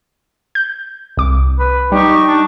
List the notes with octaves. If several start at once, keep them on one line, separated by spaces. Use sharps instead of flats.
G6
C2 D6
B4
G3 D#4 G4 C#6
D4